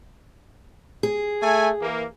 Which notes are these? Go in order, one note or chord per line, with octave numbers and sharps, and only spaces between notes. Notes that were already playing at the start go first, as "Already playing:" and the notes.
G#4
A3 G#5
E3 A#3